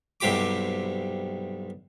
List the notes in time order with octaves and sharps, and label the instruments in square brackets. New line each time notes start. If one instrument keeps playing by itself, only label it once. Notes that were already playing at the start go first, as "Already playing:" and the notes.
[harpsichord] B1 G2 C3 G4 B5 D6